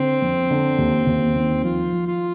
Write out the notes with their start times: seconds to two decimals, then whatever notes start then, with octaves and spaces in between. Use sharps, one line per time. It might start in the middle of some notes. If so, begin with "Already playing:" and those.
Already playing: D3 C4
0.22 F2
0.51 D3
0.78 D#2
1.07 D#2
1.36 D#3
1.64 F3 F4
1.92 F3
2.07 F4